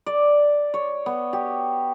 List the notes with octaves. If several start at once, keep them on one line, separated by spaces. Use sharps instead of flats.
D5
C#5
B3
G4